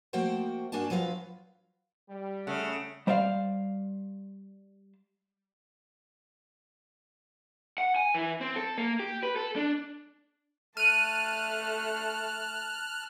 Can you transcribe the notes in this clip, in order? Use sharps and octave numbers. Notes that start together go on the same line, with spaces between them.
F3 A3 A#3 F#4 C5 G5
G2 A#3 D4 F#4 G#5 A5
F3 F#3 F4 B4 F5
G3
C#3 A3 F#5
G3 C5 D5 E5 F5
F#5
G#5
E3
C4
A4
A#3
G4
B4
A4
D4
A3 A5 F6 F#6 D#7